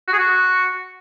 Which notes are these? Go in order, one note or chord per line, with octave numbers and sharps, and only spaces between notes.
F#4
G#4
F#4